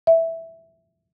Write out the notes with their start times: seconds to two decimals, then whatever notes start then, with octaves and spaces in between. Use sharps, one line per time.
0.07 E5